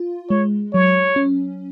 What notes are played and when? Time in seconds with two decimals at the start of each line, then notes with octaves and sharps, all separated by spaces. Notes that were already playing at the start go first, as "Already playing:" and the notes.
Already playing: F4
0.30 G#3 C#5
0.73 F#3 C#5
1.16 C#4